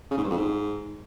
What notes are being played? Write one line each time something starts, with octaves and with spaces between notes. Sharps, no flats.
C#3
G#2
G2
F2
G#2